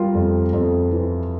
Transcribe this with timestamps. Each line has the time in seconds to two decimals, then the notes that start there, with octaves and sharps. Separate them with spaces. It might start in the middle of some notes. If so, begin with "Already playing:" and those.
Already playing: G3 F4 A#4
0.14 F2
0.53 F2
0.91 E3